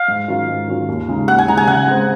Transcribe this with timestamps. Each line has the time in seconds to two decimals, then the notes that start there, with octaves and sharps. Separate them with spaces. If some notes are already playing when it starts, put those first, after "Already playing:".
Already playing: F5
0.08 G#2
0.28 D#3 F#3 C#4 F4
0.48 G#2
0.68 D#3 F#3 C#4 F4
0.88 D#2
1.08 C#3 G#3 D#4
1.27 D#2 F#5
1.38 G#5
1.48 C#3 G#3 D#4 A#5
1.57 G#5
1.67 C#3 F#5
1.87 G#3 C4